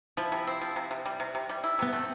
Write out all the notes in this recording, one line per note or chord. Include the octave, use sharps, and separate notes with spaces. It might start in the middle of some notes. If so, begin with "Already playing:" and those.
F3 E4
C3
C4
F3
C3
C3
G3
C3
C3
G3
E4
C3 B3
A3 C4